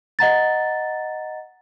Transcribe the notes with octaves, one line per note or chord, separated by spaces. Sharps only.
D#5 F#5 A#5 A6